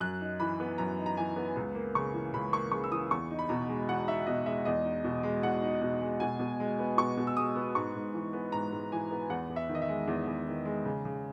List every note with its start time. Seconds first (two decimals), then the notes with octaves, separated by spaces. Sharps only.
0.01 F#2 F#6
0.21 D#4
0.40 E3 B5
0.60 B3
0.78 F#2 A#5
0.99 D#4
1.06 A#5
1.17 E3 G#5
1.36 B3
1.56 C#2
1.75 A#3
1.95 C#3 C#6
2.14 E3
2.34 C#2 B5
2.52 A#3 C#6
2.72 C#3 C#6
2.84 E6
2.91 E3 D#6
3.11 E2 C#6
3.31 D#4
3.39 B5
3.49 B2 A#5
3.69 G#3
3.88 E2 F#5
4.07 D#4 E5
4.27 B2 D#5
4.46 G#3 E5
4.65 E2 D#5
4.85 D#4
5.04 B2
5.23 G#3
5.43 E2 F#5
5.62 D#4
5.82 B2
6.02 G#3
6.20 B2 G#5
6.39 B2
6.60 G#3
6.79 B3
6.97 B2 C#6
7.17 B2
7.27 E6
7.37 G#3 D#6
7.56 B3
7.75 G#2 C#6
7.95 G#2
8.14 E3
8.33 B3
8.52 G#2 A#5
8.72 G#2
8.92 E3 G#5
9.11 B3
9.30 E2 F#5
9.49 E2
9.56 E5
9.69 D#3
9.75 D#5
9.82 E5
9.89 G#3
10.08 E2
10.27 E2
10.47 D#3
10.65 G#3
10.85 C#3
11.05 C#3